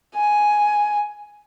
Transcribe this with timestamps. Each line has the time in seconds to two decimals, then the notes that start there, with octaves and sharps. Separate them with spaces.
0.16 G#5